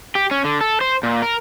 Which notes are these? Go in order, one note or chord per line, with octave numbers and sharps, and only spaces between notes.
G4
C#4
D3
A4
C5
A#2
A#4